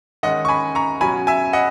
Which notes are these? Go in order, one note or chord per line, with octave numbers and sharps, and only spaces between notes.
D#3 G#3 C#4 D#5 F#5
C#6
G#5 B5
A#5 C#6
B2 F#3 C#4 G#5 B5
E5 G#5
D#5 F#5